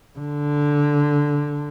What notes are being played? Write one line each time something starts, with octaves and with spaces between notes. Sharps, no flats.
D3